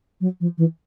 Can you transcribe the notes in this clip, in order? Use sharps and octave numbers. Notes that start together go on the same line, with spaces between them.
F#3
F3
E3